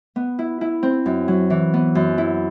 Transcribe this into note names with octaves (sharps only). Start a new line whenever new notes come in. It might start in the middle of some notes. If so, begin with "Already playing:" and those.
B3
E4
E4
C4
F#2
F#3
E3
B3
F#2
E4